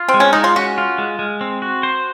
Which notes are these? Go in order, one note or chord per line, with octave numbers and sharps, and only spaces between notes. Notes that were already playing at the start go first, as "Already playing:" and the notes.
Already playing: F4
C4
G#3
C#4
G#3 D#4
F4
C#4 F#4
F4
G#3
G#3
C4
F#4
C5